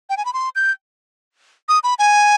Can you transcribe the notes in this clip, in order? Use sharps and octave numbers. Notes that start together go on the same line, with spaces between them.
G5
G#5
B5
C6
G6
D#6
B5
G#5